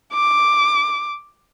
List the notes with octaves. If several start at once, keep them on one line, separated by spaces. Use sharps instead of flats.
D6